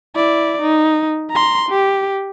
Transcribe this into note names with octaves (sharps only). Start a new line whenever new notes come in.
E4 D5
D#4
A#5 C6
G4